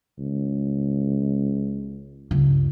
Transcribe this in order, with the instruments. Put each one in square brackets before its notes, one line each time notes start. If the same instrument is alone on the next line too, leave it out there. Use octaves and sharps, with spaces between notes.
[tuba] C#2
[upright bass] C#2 G2